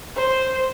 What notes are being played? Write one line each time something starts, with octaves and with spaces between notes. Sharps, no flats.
C5